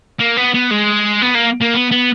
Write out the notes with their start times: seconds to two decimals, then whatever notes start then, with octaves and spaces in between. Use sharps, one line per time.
0.19 A#3
0.37 B3
0.54 B3
0.71 G#3
1.22 B3
1.35 A#3
1.62 A#3
1.75 B3
1.92 B3